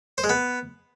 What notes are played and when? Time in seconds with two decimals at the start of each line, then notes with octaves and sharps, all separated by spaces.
0.18 C5
0.24 G#3
0.29 B3